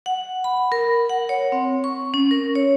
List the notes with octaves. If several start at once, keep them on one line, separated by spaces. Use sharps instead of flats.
F#5
B5
A#4
F#5
C#5
C4
C#6
C#4
A#4
C#5